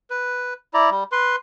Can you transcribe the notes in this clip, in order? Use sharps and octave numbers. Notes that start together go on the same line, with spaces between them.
B4
E4 D5 A#5
G3
B4 C6